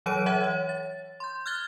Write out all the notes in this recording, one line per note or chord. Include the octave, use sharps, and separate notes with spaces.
E3 F#3 C#5 D7 D#7
E3 C#5 E5 F#5 G#6
C#5
A6
C6 G6
F6 F#6 G#6 A6 G7